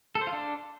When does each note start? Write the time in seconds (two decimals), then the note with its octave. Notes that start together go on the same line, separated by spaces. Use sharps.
0.15 A4
0.21 C5
0.27 F4
0.33 D4